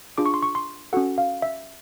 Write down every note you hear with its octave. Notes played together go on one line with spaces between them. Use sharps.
D4 F4 G#4 D6
C#6
C6
C#6
C6
C#4 F#4 A4 F#5
F5
E5